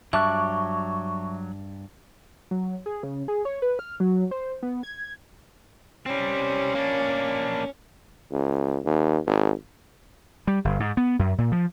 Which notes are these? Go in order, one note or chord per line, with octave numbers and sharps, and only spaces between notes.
G2 F#3 E5 A5 C#6 D6 F#6
F#3
G#4
C#3
G#4
C#5
B4
F6
F#3
C5
B3
G#6
G3 C4 C#4
A#3 D4
C#2
D#2
G#1
G3
G1
G#2
B3
F#2
A#2
F3